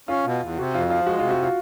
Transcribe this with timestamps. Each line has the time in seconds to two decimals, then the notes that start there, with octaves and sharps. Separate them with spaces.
0.08 C#4 F4
0.25 B2
0.41 E2
0.57 C3 F#4
0.74 F2 F4
0.90 F3 F4
1.06 G#3 F#4
1.19 F4
1.22 C3
1.30 F#4
1.43 F4